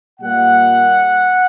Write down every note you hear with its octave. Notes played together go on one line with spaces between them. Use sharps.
A#2 G3 A#3 F#5